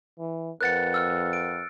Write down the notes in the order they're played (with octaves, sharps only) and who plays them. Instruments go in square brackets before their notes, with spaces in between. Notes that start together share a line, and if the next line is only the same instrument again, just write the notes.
[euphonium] E3
[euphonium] F2 [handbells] A#4 B4 F#5 [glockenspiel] F#6 A6 C#7
[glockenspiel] E6 F6
D7